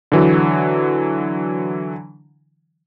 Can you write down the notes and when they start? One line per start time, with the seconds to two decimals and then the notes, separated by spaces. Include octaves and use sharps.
0.12 D3 E3 F#3